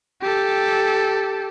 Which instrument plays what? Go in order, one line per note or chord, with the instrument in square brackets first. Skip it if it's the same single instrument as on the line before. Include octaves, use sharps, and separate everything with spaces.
[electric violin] G4 A4